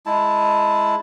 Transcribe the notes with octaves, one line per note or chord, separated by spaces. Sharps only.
G#3 E4 A5